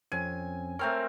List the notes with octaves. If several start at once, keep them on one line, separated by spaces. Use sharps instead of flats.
F2 C4 C#4 G#5
A3 C4 A#4 C#5 F6